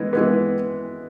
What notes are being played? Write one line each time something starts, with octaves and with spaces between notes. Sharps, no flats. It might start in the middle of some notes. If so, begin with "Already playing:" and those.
Already playing: E3 G#3 B3
E3 G#3 B3